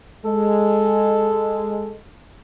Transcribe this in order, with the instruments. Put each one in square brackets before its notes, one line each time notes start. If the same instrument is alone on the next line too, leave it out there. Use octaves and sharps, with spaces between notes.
[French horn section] G#3 [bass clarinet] A4